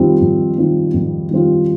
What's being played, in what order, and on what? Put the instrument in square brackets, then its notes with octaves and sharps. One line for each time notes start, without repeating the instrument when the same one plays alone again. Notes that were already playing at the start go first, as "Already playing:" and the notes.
Already playing: [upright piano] F2 D#3 G3 C4 F4
F2
D#3 G3 C4 F4
F2
D#3 G3 C4 F4